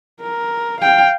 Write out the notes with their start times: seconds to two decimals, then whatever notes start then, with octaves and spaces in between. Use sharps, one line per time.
0.21 A#4
0.81 F5 G5